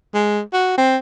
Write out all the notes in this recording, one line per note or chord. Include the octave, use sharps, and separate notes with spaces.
G#3
F#4
C4